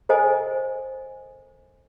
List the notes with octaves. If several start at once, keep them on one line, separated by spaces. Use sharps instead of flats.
A4 A#4 C5 D#5 G#5